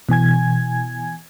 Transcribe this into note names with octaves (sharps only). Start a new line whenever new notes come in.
B2 E3 G#5 G#6